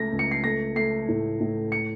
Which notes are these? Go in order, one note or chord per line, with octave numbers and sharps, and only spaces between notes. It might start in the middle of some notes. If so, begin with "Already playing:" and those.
Already playing: C#2 C#3 A3 A#6
C#2
C#7
C7
A3 A#6
A3 C7
A2
A2
C#7